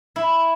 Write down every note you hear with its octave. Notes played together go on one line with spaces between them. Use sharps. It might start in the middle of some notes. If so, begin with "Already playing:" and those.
E4